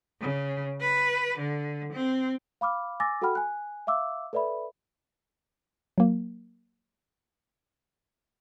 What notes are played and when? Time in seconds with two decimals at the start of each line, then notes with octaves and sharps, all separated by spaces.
0.21 C#3
0.81 B4
1.39 D3
1.93 C4
2.61 F5 B5 D6 F6
3.00 G#5 D6 E6 A6 A#6
3.22 F#4 A4 F#5 G5 B5 F6
3.35 G#5 F#6
3.87 E5 F5 D6 E6
4.33 A4 B4 D5 E5 B5
5.98 F#3 A#3